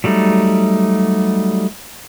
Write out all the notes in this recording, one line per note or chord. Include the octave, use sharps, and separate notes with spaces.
F#3 G3 A3 D#4